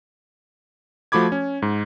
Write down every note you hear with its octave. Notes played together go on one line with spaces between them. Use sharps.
F3 A3 F#4 B5 D6 G#6
C#4
G#2